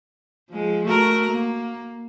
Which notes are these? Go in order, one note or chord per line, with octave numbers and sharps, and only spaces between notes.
F3 G#3
A3 F#4 A#4
A#3